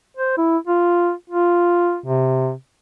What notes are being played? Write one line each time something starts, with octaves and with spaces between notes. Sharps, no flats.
C5
E4
F4
F4
C3